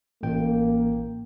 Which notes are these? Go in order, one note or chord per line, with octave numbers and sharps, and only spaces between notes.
A1 A#3 G5